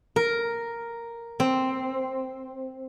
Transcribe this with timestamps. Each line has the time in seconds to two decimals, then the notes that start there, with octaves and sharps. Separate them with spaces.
0.16 A#4
1.40 C4